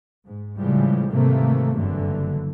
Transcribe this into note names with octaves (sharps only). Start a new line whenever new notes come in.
G#2
A2 C#3 E3 F3 G3 G#3
G#2 C3 D#3 E3 A3 A#3
F#1 E2 G2 D3 E3 F#3